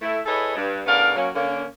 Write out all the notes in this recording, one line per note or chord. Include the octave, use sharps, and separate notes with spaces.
A3 E4
E4 G#4 A4 B4 C#5 D#5
G2
A2 C#3 B3 D4 A#4 F5
F#3 A#3 C#4
D3 A#3 C#4